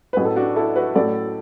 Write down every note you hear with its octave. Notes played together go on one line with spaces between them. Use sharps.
A1 A2 F#3 B4
A4
D4 F#4
E4 A4
F#4 B4
A1 A2 F#3 A4 D5